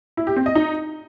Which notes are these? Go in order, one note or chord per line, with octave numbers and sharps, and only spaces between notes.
E4
G4
C4
D#5
D#4